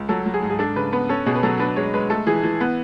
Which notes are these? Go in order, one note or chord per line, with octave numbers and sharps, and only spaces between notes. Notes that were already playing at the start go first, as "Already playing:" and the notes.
Already playing: C#2
F#3 A4
F#3
G#4
G#2
G#4
D4 A4
C#3 B4
B3 B4
C#4 A4
B2 G#4
B4
F#3 A4
D4 B4
G#3 C#5
G#3 B4
A3 A4
E3 G#4
E3
B3